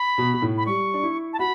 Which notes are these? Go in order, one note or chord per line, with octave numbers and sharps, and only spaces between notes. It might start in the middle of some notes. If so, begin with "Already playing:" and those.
Already playing: B5
B2
B2
A2
B5
G3 C#6
D4
E4
A5
F#4 B5